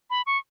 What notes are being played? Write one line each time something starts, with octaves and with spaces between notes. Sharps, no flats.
B5
C#6